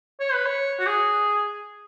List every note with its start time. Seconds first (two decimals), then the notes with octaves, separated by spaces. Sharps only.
0.20 C#5
0.33 B4
0.46 C#5
0.80 F#4
0.86 G#4